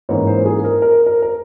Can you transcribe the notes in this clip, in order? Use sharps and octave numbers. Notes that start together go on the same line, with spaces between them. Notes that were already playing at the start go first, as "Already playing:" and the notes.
G#2 E3 A#3 C#4 C#5
C5
G#4
A#4
A#4
A#4
A#4